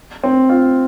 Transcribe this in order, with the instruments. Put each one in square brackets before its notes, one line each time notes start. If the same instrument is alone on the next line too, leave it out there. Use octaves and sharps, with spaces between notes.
[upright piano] C4
F4